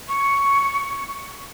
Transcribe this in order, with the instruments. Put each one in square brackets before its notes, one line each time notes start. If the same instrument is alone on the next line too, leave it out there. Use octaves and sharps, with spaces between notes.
[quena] C#6